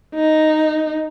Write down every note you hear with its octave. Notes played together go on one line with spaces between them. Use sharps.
D#4